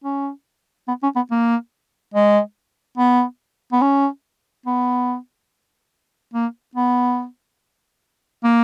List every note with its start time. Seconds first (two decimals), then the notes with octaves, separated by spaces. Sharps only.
0.04 C#4
0.88 B3
1.03 C#4
1.16 B3
1.31 A#3
2.14 G#3
2.98 B3
3.72 B3
3.82 C#4
4.66 B3
6.34 A#3
6.75 B3
8.44 A#3